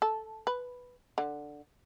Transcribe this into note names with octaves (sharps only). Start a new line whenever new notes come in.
A4
B4
D3